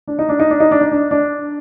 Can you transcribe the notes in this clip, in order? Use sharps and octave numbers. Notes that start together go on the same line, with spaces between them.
D4
D#4
D4
D#4
D4
D#4
D4
D#4
D4
D4